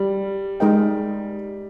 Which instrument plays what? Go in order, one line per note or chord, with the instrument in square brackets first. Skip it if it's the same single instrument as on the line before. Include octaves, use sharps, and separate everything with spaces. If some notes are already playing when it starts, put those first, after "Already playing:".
Already playing: [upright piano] G3 [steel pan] G4
[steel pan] G#3 D#4 A#4 D#5 G5